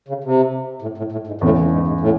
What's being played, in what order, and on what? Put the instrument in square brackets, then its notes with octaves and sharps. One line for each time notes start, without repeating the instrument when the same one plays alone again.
[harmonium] C#3
C3
A2
A2
A2
G#2
[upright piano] E2 C#3 G#3 [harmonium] A2
[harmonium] G#2
G#2
A2